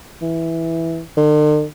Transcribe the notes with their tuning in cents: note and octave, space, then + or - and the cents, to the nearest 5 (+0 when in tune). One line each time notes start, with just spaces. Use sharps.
E3 -5
D3 +45